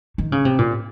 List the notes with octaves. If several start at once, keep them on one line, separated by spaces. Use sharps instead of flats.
D#3
C#3
C3
A#2